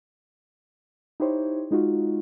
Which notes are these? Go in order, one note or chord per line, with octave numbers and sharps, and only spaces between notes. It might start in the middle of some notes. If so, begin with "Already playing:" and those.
D#4 E4 G4 C5 C#5
G#3 D#4 F4 F#4